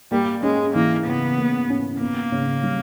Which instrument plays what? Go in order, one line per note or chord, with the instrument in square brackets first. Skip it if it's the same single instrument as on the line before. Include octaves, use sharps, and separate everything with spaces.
[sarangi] G3 [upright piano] A#3
[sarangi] G#3 [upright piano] C#4
[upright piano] E3 [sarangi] A#3
[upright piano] C#3 [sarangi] B3
[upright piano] A#3
C#4
[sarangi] A#3 [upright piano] B3
[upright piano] C#3
G3